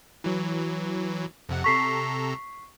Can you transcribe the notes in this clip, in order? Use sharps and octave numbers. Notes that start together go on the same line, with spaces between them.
E3 F#3
F2 C3 F#5
C3 A4 A#5 C#6 B6 C7